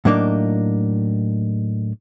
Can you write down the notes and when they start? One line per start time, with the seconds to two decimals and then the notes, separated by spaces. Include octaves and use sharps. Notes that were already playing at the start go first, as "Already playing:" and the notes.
0.05 A2 F#3 A#3 D4 D#4